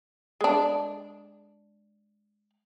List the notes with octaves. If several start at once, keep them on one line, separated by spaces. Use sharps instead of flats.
G#3 D4